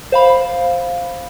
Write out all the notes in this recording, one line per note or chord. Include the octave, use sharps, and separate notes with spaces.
C5 F5 B5